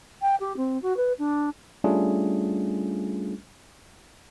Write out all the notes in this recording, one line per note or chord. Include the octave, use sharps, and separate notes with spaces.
G5
G4
C4
F#4
B4
D4
G3 A3 C#4 D4 F4 G#4